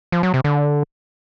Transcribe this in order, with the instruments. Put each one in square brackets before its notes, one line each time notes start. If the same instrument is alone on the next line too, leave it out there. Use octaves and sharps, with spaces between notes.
[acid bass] F3
F#3
C3
D3